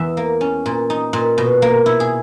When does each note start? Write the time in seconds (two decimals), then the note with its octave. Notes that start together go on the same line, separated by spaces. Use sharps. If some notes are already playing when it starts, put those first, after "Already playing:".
Already playing: E2 E5
0.17 A#3
0.41 C#4
0.66 A#2
0.90 D#4
1.13 A#2
1.38 B2
1.62 A#3
1.86 E4
2.00 G#4